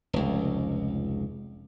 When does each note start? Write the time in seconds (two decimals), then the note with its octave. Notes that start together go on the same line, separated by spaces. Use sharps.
0.13 F1 C#2